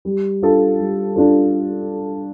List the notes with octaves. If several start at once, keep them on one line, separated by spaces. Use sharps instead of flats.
G3
D4 F4 A4
G3
D4 F4 A4